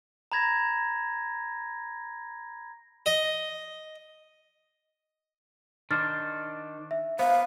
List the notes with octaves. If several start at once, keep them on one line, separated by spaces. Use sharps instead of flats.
A#5 B5 G#6 A#6
D#5
D#3 D4 C5 F6 A6
E5
B3 C5 F5